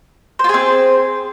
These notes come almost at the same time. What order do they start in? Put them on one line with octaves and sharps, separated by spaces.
C5 F4 G#4 C4